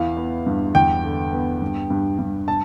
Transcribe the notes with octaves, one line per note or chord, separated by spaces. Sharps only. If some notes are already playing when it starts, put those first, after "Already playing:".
Already playing: E2 E3 F5
B3
G2
E2 G5
D3
B3
G2
G2
G2
A5